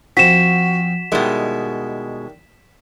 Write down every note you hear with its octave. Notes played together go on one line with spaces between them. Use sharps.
F3 C4 F#4 B6 E7
B2 D#3 G3 G#3 E4